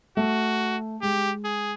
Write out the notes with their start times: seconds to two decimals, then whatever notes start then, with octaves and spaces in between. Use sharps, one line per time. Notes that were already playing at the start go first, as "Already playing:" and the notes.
0.17 A3 F#4
1.02 G#3 G4
1.45 G#4